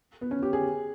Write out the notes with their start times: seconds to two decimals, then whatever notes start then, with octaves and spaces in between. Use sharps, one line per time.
0.21 B3
0.31 C#4
0.43 G4
0.53 G#4